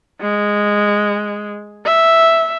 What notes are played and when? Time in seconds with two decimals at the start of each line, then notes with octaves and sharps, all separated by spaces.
0.21 G#3
1.86 E5